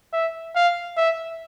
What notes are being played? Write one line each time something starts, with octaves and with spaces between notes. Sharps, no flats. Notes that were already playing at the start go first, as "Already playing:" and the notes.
E5
F5
E5